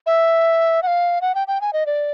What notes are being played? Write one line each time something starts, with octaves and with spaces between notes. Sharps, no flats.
E5
F#5
F5
F#5
G5
G5
G#5
D#5
D5